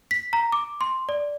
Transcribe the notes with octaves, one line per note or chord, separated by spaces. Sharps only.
B6
A#5
D6
C6
D5